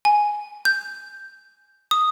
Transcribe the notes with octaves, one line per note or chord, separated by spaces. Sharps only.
G#5
G6
D#6